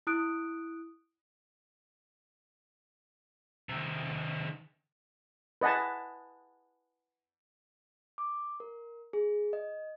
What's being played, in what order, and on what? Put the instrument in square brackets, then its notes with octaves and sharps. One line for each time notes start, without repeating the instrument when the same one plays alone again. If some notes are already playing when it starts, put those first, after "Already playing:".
[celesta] E4 D#6 F#6 D7
[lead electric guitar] C3 D#3
[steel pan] B4 D#5 F#5 G#5 A5
[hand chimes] D6
A#4
G#4
D#5